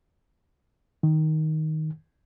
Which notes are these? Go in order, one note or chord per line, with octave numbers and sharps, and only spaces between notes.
D#3